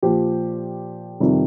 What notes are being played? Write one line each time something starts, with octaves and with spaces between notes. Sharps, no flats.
A#2 F3 G4
F2 C3 D#3 G3